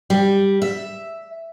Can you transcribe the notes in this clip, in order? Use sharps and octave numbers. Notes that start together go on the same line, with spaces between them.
G3
E5